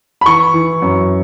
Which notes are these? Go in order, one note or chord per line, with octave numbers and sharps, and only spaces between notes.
B5
E3 C#6
E3
F#2